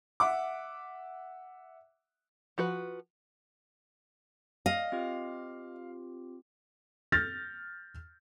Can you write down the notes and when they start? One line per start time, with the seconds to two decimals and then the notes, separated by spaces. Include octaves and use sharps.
0.20 E5 F#5 D6
2.58 F3 F#4 B4
4.66 D#5 F5
4.92 C4 F4 G4
7.12 F6 G6 A6 A#6